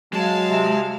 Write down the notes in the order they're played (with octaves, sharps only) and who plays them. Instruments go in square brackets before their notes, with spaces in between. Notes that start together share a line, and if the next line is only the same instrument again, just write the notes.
[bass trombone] F#3 [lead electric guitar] G#3 [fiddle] F5 A5
[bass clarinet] C3